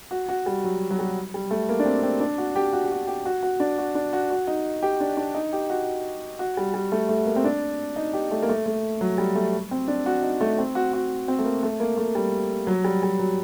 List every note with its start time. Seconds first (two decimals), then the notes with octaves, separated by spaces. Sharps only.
0.11 F#4
0.29 F#4
0.46 G3
0.64 F#3
0.91 F#3
0.99 G3
1.34 G3
1.51 A3
1.69 A#3
1.80 D4
1.85 C4
2.03 C4
2.20 D4
2.38 F#4
2.56 G4
2.73 F#4
2.84 G4
2.91 F#4
3.07 G4
3.26 F#4
3.43 F#4
3.60 D4
3.78 F#4
3.95 D4
4.13 F#4
4.30 F#4
4.47 D#4
4.83 G4
5.00 D4
5.17 D4
5.34 D#4
5.53 G4
5.70 F#4
6.39 F#4
6.57 G3
6.74 G3
6.92 A3
7.09 A3
7.26 A#3
7.36 C4
7.44 D4
7.96 D#4
8.14 G4
8.31 A3
8.43 A#3
8.49 A3
8.66 A3
9.01 F#3
9.18 G3
9.35 A3
9.71 C4
9.88 D4
10.06 F#4
10.23 D#4
10.41 A3
10.58 C4
10.75 F#4
10.93 F#4
11.28 C4
11.39 A3
11.45 A#3
11.63 A3
11.80 A#3
11.97 A3
12.15 G3
12.67 F#3
12.84 G3
13.03 G3
13.19 F#3